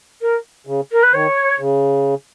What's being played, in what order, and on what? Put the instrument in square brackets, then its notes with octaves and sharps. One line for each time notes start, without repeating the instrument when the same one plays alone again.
[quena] A#4
[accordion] C#3
[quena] A#4
B4
[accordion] D#3 [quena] C#5
[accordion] C#3